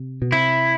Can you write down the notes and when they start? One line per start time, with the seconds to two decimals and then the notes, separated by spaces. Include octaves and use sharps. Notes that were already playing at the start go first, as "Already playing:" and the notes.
Already playing: C3
0.22 B2
0.32 C3 E4